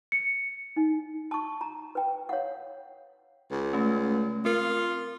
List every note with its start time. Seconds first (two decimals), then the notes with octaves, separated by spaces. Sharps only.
0.12 C#7
0.76 D#4
1.31 A5 C#6
1.61 A#5
1.95 B4 G5
2.29 C#5 F5 F#5
3.51 C#2
3.73 A3 C#4
4.45 C4 F4 A#4